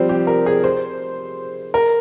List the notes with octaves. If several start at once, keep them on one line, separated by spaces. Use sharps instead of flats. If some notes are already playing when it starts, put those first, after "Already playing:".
Already playing: F3 G3 C4
G4
A#4
G#4
C5
A#4